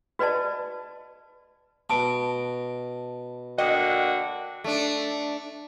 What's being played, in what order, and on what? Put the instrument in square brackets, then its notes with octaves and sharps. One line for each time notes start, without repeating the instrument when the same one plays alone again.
[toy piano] F#4 B4 D5 D#5 A5
[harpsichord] B2 [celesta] A5 D7
[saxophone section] D3 A#3 F#4 [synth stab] D#5 [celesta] G5
[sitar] A3 D4